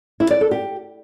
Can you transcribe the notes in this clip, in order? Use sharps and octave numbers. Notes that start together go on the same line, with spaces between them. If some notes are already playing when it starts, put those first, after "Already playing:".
E4
D5
A4
G4